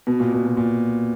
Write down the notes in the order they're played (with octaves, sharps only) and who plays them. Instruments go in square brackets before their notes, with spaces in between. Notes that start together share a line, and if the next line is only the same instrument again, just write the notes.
[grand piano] B2
A#2
B2
B2
A#2